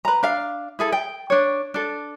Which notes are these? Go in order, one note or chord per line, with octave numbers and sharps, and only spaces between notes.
B4 A#5
D4 F5
E4 G#4 A4
G5
D4 C#5
D4 A4